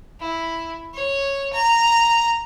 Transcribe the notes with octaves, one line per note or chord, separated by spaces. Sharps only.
E4
C#5
A#5